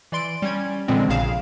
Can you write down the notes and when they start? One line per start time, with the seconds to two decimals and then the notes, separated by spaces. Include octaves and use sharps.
0.12 E3 D5 C6 D7
0.42 G3 C#4 G#6
0.88 A#2 D3 E3 F3 G#3 C4
1.08 A#1 A#2 C#3 G#4 F5 E7